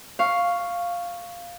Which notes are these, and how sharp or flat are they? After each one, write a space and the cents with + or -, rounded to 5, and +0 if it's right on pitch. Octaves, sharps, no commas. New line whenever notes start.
F5 +0 C#6 +0